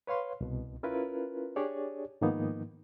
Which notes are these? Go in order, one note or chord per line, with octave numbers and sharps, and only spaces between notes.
B4 C#5 F5 C6
C2 B2
C#4 E4 F4 A#4 B4
D4 G4 G#4 C#5 D5
G#2 D#3 F3 A#3 B3 D#4